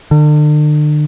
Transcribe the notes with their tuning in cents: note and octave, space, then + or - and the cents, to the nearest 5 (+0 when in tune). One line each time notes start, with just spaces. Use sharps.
D3 +40